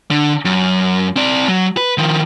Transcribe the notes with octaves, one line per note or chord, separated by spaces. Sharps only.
D3
F#2
C4 D5
F#3
B4
D#3 F3